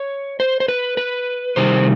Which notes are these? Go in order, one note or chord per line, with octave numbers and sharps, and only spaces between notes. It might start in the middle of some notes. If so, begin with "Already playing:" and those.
Already playing: C#5
C5
C5
B4
B4
C3 D#3 G3 C5